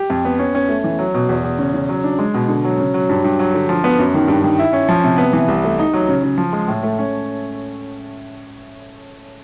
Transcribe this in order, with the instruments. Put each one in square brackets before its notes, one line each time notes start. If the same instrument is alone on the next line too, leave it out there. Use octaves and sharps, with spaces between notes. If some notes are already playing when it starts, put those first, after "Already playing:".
Already playing: [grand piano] G4
F2
B3
C#4
C#4
A3
E3
F#3
B2
E2
E2
C#3
C#3
F#3
D4
G#3
B2
D3
F#3
C#3
F#3
G2
G2
F#3
D3
F3
B3
F#2
D#3
G2
D#3
E4
C#4
F3
C3
B3
E3
C2
A3
D#4
F#3
C#3
C#3
F3
G#3
A2
A3
C#4